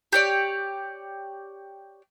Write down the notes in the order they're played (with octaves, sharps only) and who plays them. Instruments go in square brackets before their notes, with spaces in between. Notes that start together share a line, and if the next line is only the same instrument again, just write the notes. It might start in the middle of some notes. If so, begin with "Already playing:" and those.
[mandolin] G4 C#5 D5